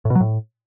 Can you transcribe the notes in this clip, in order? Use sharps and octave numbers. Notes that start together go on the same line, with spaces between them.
A2
B2
F#3
A2